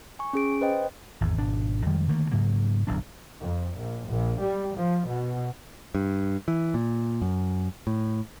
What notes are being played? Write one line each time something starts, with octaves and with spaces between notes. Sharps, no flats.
G#5 C#6
C#4 G#4 D7
B4 C5 D#5 G5
G#1 E2
G#1 B2 D4
F2 D#3 G3 G#3
D3 D#3 A3 A#3
G#2 C#3 F#3 A#3
D1 B1 F#2 D4
F2
A#1
A#1
G3
F3
B2
G2
E3
A#2
F#2
A2